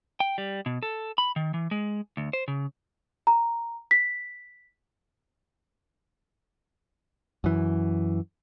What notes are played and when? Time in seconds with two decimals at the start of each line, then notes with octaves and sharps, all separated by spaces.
0.20 G5
0.38 G3
0.66 B2
0.83 A4
1.18 B5
1.36 D#3
1.54 E3
1.71 G#3
2.17 D2
2.33 C5
2.48 C#3
3.27 A#5
3.91 B6
7.44 F#2 E3